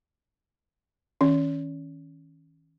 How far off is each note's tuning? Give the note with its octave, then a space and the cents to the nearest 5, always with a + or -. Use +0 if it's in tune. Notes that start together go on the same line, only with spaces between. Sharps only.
D#3 +35 C#4 +0